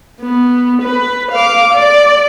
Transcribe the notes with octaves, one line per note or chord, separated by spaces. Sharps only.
B3
B4
F5 D6
D5